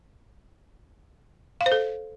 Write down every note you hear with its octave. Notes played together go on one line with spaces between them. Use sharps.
F5
C5
A4